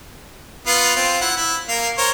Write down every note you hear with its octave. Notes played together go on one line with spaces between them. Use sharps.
B3 F4 F5
C4 F4
E4 F#5
E4
A#3 F5
A#4 C5 C#5